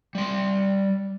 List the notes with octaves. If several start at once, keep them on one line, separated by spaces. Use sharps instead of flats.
G3 C6